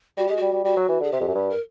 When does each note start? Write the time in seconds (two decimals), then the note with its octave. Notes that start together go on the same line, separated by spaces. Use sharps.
0.17 G3 F#4
0.27 G#3 G4
0.37 G3 F#4
0.53 G3
0.64 G3 F#4
0.77 F#3
0.89 E3
1.00 D3 G#4
1.12 C3 G4
1.20 F2
1.28 F#2
1.35 G2
1.50 A#4